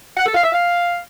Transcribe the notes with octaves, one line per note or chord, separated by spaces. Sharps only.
F#5
A4
F5
E5
F5